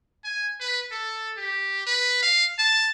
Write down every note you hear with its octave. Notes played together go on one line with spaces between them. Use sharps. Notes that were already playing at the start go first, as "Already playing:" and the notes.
G#5
B4
A4
G4
B4
F5
A5